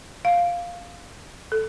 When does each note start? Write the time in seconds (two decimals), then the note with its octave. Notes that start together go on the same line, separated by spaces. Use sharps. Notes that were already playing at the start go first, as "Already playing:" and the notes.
0.25 F5
1.52 A4